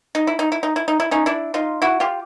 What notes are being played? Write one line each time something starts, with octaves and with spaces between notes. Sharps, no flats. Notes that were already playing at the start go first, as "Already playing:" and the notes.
D#4
E4
D#4
E4
D#4
E4
D#4
E4
C#4 D#4
D4 E4
D#4 F4
E4 F#4
F4 G4